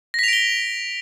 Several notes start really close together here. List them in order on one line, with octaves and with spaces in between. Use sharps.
A#6 B6 F7 D7 G7